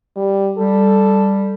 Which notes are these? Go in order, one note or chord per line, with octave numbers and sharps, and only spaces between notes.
G3
G3 A4